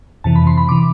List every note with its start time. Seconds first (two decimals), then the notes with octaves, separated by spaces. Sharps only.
0.24 F2 C3 E3 A5
0.36 B5
0.47 C6
0.58 B5
0.69 C3 E3 D6